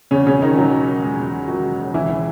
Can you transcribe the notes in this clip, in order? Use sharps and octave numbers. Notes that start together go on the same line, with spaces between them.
E2 C#3 C#4
E1 C#3 C#4
E1 D#3 D#4
E1 F#3 F#4
E1
D#3
E2 G#3 G#4
E2
E1
D#3 F#3 F#4
E1
E1
C#2 E3 E4
E3